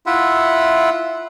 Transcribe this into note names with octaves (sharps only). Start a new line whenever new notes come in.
E4 F4 E5 F#5